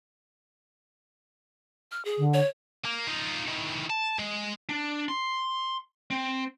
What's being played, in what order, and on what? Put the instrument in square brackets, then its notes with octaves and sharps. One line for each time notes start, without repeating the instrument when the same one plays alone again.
[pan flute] F6
G#4
[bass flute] D3
[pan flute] C#5
[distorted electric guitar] A#3
D#4 F4
D#3 E3
A5
G#3
[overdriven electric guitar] D4
C6
C4